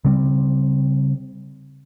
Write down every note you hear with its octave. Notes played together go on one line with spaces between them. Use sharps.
C#3 G3 C4